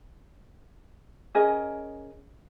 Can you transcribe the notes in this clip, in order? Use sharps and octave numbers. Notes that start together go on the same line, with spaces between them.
C#4 G#4 A#4 D#5